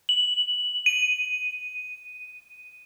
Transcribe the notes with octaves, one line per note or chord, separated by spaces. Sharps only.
F#7
D#7